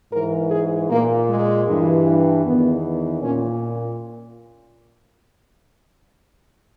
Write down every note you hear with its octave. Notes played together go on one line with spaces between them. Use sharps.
G#2 E3 A#4
G#4
A#2 A#3
G#3
G2 E3
E2 D#3 B3
A#2 C#4